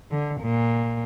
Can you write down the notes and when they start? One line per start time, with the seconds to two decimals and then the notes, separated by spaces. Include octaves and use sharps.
0.11 D3
0.42 A#2